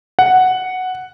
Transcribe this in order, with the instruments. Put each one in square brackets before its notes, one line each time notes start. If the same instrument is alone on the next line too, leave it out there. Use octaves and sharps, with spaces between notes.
[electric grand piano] F#5